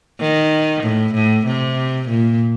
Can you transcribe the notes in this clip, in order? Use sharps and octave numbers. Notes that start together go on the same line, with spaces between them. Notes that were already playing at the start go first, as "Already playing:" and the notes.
D#3
A2
A2
C3
A#2